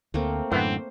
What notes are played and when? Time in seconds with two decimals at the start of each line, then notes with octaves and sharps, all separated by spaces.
0.14 D2 A3 A#3 C4
0.52 F#2 A2 D3 E3 B3 C4 C5